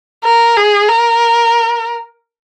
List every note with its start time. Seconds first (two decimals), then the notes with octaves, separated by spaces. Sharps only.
0.24 A#4
0.57 G#4
0.89 A#4